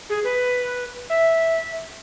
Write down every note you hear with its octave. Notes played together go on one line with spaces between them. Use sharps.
G#4
B4
E5